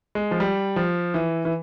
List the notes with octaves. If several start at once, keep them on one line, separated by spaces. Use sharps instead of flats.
G#3
F3
G3
F3
E3
E3